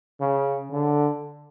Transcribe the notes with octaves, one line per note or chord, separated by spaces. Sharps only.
C#3
D3